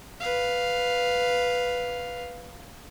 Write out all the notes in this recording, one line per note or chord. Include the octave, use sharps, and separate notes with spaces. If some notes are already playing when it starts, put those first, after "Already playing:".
B4 F5